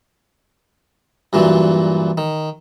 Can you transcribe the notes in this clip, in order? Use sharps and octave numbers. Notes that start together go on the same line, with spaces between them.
G2 A#2 E3 F#3
D#3